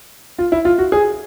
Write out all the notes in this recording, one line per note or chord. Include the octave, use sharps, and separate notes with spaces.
F4
E4
F4
F#4
G#4